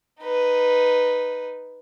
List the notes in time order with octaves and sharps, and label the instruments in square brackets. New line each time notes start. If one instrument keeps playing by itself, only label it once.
[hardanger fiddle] D#4 B4